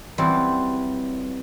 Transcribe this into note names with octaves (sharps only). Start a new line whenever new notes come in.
E3 F#3 G3 C4